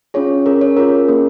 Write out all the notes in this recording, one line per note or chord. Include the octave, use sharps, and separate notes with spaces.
C#4 F4 G#4 C#5
C#4 G#4 A#4
C#5
C#4 F4 G#4 A#4
A#3 C#4 G#4